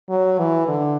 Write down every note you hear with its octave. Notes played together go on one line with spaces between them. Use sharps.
F#3
E3
D3